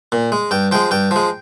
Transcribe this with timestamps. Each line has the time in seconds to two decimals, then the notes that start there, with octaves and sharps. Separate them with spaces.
0.12 A#2
0.32 G#3
0.51 G2 G5
0.72 F3 G#3 G5
0.91 G2 G5
1.11 F3 G#3